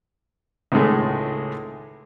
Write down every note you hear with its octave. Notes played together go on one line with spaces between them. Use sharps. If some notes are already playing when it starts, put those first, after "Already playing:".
C#2 A2 D#3 G#3 A3